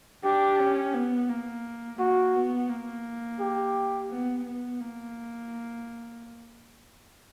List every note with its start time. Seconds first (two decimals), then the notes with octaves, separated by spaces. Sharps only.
0.24 D4 G4
0.59 C#4
0.94 B3
1.29 A#3
1.99 A#3 F#4
2.35 B3
2.69 A#3
3.40 G4
4.10 B3
4.45 B3
4.81 A#3